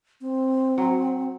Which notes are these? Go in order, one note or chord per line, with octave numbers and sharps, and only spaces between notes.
C4
F#3